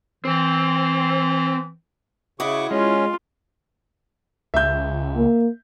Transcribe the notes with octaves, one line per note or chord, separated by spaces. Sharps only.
E3 C4
C#3 E4 F#4 D#5 C#6 D6
G#3 C#4 F4
C#2 E5 G6
A#3